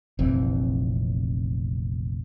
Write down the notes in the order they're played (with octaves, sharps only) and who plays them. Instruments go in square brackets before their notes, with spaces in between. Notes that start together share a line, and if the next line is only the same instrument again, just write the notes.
[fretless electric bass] F1 A#1 E3 C4